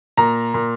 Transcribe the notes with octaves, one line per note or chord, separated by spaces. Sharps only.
A#2 A#5
A#2